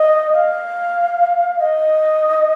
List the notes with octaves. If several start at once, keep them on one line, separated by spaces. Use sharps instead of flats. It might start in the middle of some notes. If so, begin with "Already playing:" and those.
Already playing: D#5
F5
D#5